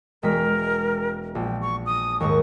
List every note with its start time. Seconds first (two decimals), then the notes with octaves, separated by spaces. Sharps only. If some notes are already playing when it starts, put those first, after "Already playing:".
0.23 E1 G#3 A#4 B6
1.35 A#1 G5
1.61 C#6
1.86 D#6
2.20 D#2 G#2 C#6